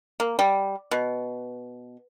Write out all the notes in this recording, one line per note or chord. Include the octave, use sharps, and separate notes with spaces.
A#3
G3
B2